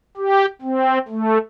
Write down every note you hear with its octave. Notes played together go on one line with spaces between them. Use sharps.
G4
C4
A3